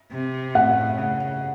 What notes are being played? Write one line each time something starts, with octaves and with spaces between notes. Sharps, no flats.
C3
A2 F#5
C#3